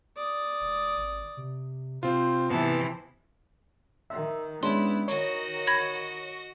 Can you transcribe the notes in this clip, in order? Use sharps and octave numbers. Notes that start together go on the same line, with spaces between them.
D5 D#6
E1
G#1
C3
C3 C4 F4 C5
G#2 C3 E3 B3 A5
D#3 E5
G#3 B3 C#4 D4 E4 C6
D#3 F#4 C#5 D#5
B5 G#6 A#6